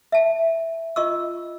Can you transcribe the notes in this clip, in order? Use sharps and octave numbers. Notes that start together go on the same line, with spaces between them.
E5 A5
F4 D#5 C#6 E6